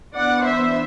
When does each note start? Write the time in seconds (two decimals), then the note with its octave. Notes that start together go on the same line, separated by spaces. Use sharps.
0.15 E3 B3 D4 D5 F#5
0.45 C5 E5